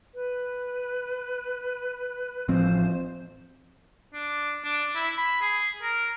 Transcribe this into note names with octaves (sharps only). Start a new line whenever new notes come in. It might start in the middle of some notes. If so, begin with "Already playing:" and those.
B4
A1 F3 C4 C5
D4
D4
E4
B5
G#4
A#4